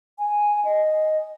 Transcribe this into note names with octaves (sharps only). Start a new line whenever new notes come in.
G#5
D#5